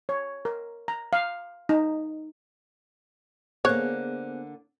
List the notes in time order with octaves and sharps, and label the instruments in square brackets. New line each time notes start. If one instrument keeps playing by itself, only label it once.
[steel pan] C#5
A#4
A#5
F5
D#4
[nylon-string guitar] D3 A#3 [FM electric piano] B3 G#4 [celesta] C5 F#6 [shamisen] C#5